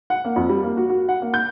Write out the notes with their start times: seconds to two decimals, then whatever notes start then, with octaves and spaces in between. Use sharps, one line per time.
0.10 F#5
0.25 A#3
0.36 F2
0.49 G3
0.63 A#3
0.77 F#4
0.90 F#4
1.09 F#5
1.22 A#3
1.34 G6